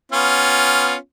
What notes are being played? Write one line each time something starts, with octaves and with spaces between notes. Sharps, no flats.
B3 C#4 F4